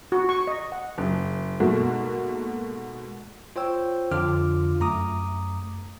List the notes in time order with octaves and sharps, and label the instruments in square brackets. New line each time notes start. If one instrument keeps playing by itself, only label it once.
[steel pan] F#4
C#6
D#5
F#5
[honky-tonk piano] F#1
G#2 B2 A3 A#3 F#4
[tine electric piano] F4 C5 C#5 G5 E6
F2 D3 F4 D6 F6
F#2 A3 A#5 D6 D#6